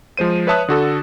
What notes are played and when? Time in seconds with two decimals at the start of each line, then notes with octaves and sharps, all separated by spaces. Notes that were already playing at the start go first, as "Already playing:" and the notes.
0.17 F3 G#3 C5 D#7
0.47 B4 C#5 E5 A5 D#6 F#6
0.68 D3 F#4 A4